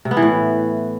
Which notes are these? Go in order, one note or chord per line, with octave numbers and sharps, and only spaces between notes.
C3
B3
E3
A2